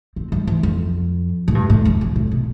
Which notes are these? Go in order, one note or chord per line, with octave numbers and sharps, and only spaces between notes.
C4
G3
E3
F2
A2
G2
A2
F2
F2
A2
B2